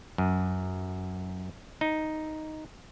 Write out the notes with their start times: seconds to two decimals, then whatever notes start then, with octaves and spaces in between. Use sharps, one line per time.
0.18 F#2
1.81 D#4